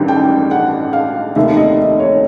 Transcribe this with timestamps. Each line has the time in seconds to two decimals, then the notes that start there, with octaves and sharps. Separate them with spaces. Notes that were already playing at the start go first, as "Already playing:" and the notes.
Already playing: A1 G2 D#3 G3
0.08 G5
0.51 F#5
0.93 F5
1.36 F1 D#2 D#3 E5
1.57 D#5
2.00 C#5